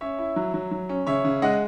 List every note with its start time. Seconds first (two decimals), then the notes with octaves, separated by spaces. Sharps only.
0.01 C#4 C#5 E5
0.19 E4
0.36 F#3
0.54 F#3
0.71 F#3
0.89 C#4
1.07 C#3 C#5 E5
1.25 C#3
1.42 G#3 D#5 F#5